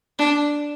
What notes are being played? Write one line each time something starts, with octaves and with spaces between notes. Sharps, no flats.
D4